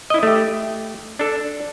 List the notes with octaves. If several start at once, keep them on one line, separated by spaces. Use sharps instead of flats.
E4 D#5
A3 G4
D4 A4